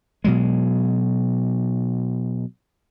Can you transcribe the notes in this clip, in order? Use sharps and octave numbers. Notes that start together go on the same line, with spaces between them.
B2 F#3 G#3